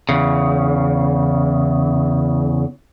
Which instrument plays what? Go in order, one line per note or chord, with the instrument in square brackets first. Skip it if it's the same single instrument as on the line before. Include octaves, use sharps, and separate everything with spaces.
[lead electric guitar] E2 C#3